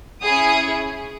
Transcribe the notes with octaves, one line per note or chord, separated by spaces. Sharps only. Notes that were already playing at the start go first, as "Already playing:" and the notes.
C#4 E4 G#4 D#6